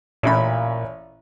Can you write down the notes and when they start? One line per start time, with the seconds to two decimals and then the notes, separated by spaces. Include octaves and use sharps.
0.23 A1 A#2 C#4 B5